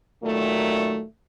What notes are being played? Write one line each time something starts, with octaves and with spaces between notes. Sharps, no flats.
A#2 D#3 F#3 A3